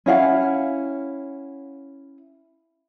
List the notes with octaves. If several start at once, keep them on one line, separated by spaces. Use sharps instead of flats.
C#4 E4 F5 F#5